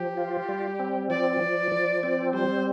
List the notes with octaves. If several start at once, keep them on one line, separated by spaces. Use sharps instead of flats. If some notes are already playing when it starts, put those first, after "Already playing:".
Already playing: F3 G4
F4
G3
C4
F3 D5
F3
F3
C4
G3 C5